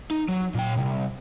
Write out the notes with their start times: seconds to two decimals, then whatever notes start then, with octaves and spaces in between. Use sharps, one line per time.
0.11 D#4
0.28 F#3
0.54 A#2 G5
0.78 C2